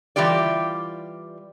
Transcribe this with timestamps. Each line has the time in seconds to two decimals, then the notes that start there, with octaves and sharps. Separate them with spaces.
0.16 E3 G3 F4 G4 D5